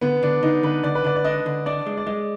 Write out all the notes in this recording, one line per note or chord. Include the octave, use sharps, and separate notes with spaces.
D3 B3
D3 D4
D3 D#4
D3 B4
D3 D5
B4
D3 D5
D5
D4 D#5
D3
D4 D5
G#3
D5
G#3 D#5